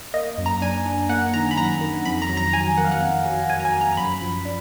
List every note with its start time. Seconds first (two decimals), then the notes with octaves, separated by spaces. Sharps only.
0.14 A#3 D#5
0.38 F#2
0.46 A#5
0.62 D4 G#5
0.86 D4
1.09 A#3 F#5
1.34 D#3 A#5
1.51 B5
1.57 F#2 A#5
1.81 D#3
2.05 F2 B5
2.22 A#5
2.29 F#3
2.37 A#5
2.53 F#3 G#5
2.77 A#3 F#5
2.85 F5
2.92 F#5
3.01 F2
3.25 F#3
3.49 F#3 G#5
3.60 A#5
3.65 G#5
3.73 A#3
3.81 A#5
3.93 A#5
3.97 F#2 B5
4.21 F3
4.45 D4